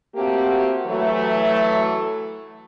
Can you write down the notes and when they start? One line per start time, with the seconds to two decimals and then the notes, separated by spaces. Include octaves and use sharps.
0.16 A3 A#3 C4 F#4 G4
0.87 E3 F#3 A3